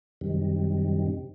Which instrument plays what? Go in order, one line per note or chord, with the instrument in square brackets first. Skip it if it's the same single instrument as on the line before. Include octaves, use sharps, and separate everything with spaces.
[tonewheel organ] F#2 C3 D#3 G3